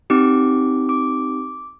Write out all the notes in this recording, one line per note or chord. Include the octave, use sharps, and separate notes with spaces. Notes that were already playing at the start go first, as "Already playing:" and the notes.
C4 D#4 G4 D6
D6